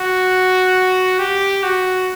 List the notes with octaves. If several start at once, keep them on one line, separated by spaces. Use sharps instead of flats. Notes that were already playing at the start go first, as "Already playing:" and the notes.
Already playing: F#4
G4
F#4